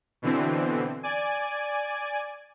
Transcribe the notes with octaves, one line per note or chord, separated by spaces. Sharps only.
B2 D3 E3 C4
D5 G#5